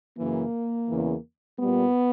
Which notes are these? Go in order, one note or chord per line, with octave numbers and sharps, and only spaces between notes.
F#2 C#3 E3 A#3
E2 C#3 E3
A#2 G3 B3